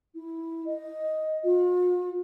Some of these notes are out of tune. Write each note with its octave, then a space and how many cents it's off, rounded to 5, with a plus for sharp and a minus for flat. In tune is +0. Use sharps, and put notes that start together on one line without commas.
E4 -10
D#5 +5
F4 +45